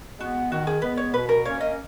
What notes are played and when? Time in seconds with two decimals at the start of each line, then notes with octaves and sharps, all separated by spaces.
0.19 G#3 B3 F#4
0.51 D#3 F#4
0.67 G#4
0.82 G#3 B3 B4
0.97 C#5
1.14 B2 B4
1.29 A#4
1.45 A#3 C#4 C#5
1.61 D#5